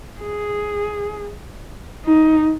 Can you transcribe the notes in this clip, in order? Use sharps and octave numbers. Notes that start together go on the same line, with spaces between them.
G#4
D#4